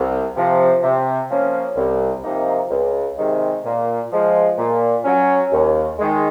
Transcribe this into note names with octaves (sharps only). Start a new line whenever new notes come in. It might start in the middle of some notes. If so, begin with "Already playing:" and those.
Already playing: C2
C3 F3
C3
F3 A#3 C#4
C2
C3 F3 A#3 D#4
C#2
C3 D#3 G#3
A#2
F3 G#3
A#2
F#3 C#4
D#2
D#3 G#3